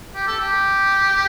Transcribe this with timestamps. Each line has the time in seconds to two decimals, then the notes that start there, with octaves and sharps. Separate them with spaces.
0.15 G4
0.27 A4
0.39 G4